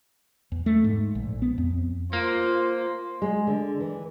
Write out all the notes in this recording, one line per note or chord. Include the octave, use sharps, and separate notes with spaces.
E2
A3
G#2
A#1
B3
F2
A#3 F4 C5
G#3
D3
E3